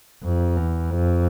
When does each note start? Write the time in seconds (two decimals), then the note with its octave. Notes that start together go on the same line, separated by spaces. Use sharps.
0.23 F2
0.57 E2
0.90 F2